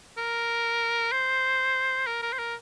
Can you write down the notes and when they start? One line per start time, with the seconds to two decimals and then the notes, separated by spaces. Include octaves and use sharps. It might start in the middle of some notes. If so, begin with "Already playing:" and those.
0.18 A#4
1.12 C5
2.07 A#4
2.23 A#4
2.33 C5
2.38 A#4